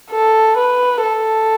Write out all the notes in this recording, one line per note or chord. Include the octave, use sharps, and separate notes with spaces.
A4
B4
A4